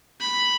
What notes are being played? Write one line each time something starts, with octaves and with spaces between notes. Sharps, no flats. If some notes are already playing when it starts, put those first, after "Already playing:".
B5